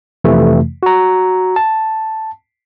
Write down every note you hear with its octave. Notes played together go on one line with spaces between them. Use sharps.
F2 C3 E3 A3
F#4 A#5
A5